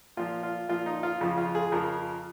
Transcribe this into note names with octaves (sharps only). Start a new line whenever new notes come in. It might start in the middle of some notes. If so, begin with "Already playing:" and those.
A#2 F3 F4
F4
A#2 F3 F4
D#4
F4
F2 C#3 F3
F4
G#4
F2 C#3 F3 A#4